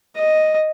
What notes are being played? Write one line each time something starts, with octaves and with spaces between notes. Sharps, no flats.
D#5